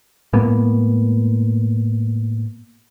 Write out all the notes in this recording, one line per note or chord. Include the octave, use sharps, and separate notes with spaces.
A2 G#3 A#3 B3